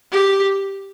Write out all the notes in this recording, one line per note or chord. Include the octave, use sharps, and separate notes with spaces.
G4